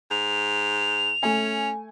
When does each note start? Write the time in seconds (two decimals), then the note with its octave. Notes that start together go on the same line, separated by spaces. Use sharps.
0.11 G#2 F7
1.23 A3 C#4 G#5